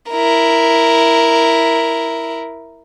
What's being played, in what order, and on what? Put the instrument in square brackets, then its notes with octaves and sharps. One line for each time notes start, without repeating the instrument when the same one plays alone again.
[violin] E4 A#4